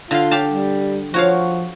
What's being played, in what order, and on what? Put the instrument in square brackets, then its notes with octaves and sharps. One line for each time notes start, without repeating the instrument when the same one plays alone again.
[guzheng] D3 F5 [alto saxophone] F4
[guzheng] G4 F5 A5
[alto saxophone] G3
[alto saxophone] F3 [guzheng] F#4 C#5 F5